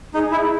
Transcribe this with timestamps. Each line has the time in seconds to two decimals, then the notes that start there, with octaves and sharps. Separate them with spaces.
0.14 D#4 G#4
0.32 E4